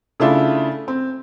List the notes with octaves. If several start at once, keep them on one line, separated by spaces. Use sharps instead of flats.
C#3 A3 D4 E4 F4
C4